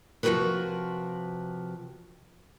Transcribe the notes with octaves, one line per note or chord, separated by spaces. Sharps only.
C3 F3 G3 F#4 A#4 B4